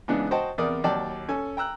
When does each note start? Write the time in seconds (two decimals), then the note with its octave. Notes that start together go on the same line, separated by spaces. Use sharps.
0.08 G#2 C#3 E3 B3 D4
0.31 F#4 C5 D#5 G5 A5
0.58 E2 C3 A#4 D5 D#6
0.84 D#2 F#3 D5 G5 A5
1.29 C#4 A4 G#5
1.57 G5 A#5 E6 F#6